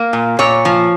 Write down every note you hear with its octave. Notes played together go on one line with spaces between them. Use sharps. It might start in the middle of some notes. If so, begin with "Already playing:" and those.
Already playing: A#3
A#2
A#2 C#5
F3